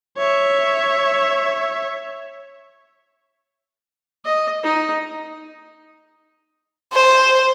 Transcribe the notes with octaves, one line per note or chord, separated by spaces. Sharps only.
C#5 E5
D#5
D#4
C5